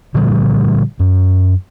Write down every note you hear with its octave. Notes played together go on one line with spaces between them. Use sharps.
A#2 D3 F3 G3
F#2